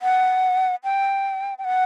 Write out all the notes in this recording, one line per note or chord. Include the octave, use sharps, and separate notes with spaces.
F#5
G5
G5
F#5